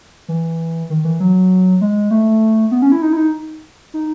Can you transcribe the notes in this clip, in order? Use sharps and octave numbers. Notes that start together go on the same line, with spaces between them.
E3
D#3
E3
F#3
G#3
A3
B3
C#4
E4
D#4
E4
D#4
D#4